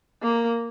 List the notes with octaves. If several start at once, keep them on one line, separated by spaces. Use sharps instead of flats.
A#3